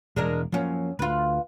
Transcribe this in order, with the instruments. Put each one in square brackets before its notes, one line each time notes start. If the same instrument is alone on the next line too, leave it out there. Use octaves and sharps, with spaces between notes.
[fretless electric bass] E1 [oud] G#3 D4 A#4
[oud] F#2 C#4 [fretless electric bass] F3 A#3
[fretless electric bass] D2 [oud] F4 B4